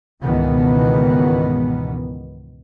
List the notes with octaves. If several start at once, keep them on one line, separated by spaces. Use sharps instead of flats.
C#2 G#2 B2 D#3 E3 B3